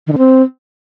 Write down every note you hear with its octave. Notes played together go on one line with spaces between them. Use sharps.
D#3
D3
C4